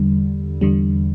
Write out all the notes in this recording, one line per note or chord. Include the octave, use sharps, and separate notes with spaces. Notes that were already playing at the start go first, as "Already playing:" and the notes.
Already playing: E2 D3 G3
E2 D3 G3